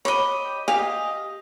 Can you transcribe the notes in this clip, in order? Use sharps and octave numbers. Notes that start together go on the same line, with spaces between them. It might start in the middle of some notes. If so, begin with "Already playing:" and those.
C#5 D#5 B5 D6
G4
G4 D#5 F5 G#5